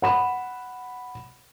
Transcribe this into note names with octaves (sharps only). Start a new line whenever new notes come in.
F#5 B5 E7